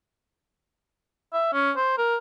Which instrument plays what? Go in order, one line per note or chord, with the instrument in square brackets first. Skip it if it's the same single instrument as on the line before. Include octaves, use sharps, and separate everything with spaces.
[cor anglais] E5
C#4
C5
A#4